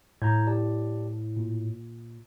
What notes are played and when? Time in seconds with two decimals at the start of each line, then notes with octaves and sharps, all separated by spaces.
0.22 A2 A#5 G6 G#6
0.47 G4 D5 A5
1.36 A#2